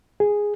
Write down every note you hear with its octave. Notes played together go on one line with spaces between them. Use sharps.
G#4